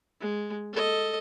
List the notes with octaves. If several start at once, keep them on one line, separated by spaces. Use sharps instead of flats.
G#3
A4 D#5